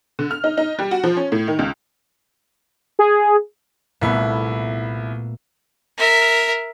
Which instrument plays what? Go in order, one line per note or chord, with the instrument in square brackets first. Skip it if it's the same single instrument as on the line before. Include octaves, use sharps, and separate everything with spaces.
[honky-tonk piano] D3
F6
D#4
D#4
G3
F#4
F3
C#4
A2
D#3
C#2
[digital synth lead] G#4
[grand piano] C2 E4 [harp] A#2 A3 B3
[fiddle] A#4 E5